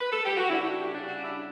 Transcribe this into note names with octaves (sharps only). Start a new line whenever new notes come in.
B4
A4
G4
F#4
C#3 G3 D4 E4
G4
G4
C#3 G3 D4
F#4
E4